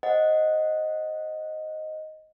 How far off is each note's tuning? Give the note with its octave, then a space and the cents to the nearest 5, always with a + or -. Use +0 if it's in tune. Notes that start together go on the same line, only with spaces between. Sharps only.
C5 +10 D#5 +0 F#5 -10